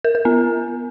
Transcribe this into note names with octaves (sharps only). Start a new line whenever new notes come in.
A#4
A#4
B3